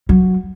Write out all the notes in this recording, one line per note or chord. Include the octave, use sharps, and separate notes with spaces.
F#3